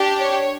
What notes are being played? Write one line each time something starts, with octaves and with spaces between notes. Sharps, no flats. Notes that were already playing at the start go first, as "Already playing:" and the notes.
Already playing: D4 G4
C#5